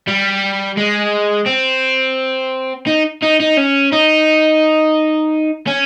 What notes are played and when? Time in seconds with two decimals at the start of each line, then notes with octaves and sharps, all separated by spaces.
0.07 G3
0.77 G#3
1.47 C4
2.87 D#4
3.22 D#4
3.40 D#4
3.57 C#4
3.92 D#4
5.67 C#4